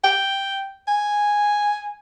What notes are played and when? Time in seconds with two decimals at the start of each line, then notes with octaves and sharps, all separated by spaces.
0.04 G5
0.88 G#5